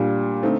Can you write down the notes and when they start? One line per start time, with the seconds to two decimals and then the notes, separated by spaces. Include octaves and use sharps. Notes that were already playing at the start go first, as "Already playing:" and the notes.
Already playing: A#2 G3 D4
0.43 D3 A3 C4 D#4